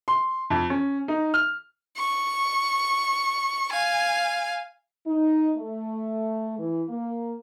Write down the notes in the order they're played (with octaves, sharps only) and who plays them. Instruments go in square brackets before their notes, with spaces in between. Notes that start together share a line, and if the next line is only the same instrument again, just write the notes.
[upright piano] C6
F2
C#4
D#4
F6
[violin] C#6
F5 G#5
[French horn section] D#4
A3
E3
A#3